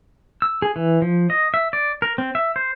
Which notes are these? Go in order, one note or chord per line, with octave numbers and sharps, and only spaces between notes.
E6
G#4
E3
F3
D#5
E5
D5
A#4
C4
E5
C5